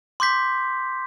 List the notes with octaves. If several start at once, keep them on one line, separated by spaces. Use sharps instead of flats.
C6 D6 G6 B6